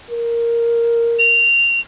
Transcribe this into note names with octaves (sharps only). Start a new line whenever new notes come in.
A#4
F7